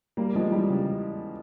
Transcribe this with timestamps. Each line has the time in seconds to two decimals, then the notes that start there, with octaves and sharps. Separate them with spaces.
0.17 G3 A#3
0.35 F3 G#3
0.51 E3 G3
0.70 C#3